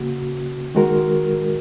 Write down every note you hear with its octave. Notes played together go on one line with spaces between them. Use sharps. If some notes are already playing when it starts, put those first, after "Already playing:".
Already playing: C#3 A#3 F#4
D#3 G#3 F#4 A#4